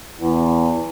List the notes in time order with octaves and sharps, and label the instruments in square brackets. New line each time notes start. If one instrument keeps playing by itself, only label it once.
[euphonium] E2